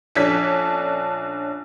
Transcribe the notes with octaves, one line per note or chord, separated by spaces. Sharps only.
A#1 C#4 D4 A4 G#6 B6